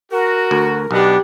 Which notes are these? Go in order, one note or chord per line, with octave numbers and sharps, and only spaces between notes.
F#4 A#4
D2
B1 B3 D4 G4 D#5